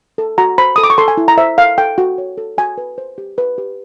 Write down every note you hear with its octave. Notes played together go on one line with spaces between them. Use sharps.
A4
F#4 A#5
C5 B5
A4 D#6
D6
C#6
A4 C6
G#5
E4
A#5
C5 E5
A4 F5
A4 G5
F#4
C#5
A4
F#4 G#5
B4
C5
G4
B4
G4